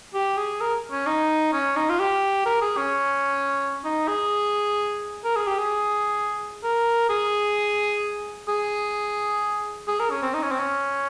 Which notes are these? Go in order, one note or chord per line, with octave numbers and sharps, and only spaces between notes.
G4
G#4
A#4
C#4
D#4
C#4
D#4
F4
G4
A#4
G#4
C#4
D#4
G#4
A#4
G#4
G4
G#4
A#4
G#4
G#4
G#4
A#4
C#4
C4
D#4
C#4
C4
C#4